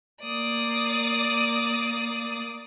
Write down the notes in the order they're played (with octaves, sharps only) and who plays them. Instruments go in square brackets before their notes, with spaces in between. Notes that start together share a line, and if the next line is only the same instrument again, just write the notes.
[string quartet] A#3 D5 D#6